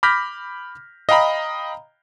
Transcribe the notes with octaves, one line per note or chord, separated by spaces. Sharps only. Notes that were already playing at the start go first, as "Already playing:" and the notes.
B5 D6 F6 G6 A#6 B6
D#5 F5 G5 A#5 B5